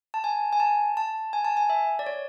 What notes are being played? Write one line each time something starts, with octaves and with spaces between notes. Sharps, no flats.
A5
G#5
G#5
A5
A5
G#5
A5
G#5
E5
D5
C#5